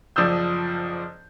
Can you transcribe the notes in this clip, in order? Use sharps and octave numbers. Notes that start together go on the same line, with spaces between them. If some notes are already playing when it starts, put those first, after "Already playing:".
F#1 F3 D5 D#6 E6 G6